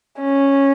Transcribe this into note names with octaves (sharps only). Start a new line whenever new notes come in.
C#4